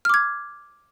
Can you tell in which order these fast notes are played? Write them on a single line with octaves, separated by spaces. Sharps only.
F6 D6 G#6